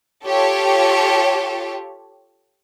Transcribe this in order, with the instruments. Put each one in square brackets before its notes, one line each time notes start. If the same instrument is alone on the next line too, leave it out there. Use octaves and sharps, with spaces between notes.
[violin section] F4 G4 A4 C#5